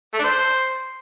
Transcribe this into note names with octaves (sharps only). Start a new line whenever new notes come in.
A3
D4
C5